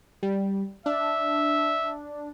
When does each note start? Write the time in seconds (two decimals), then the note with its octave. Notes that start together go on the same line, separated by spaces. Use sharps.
0.23 G3
0.86 D4 E5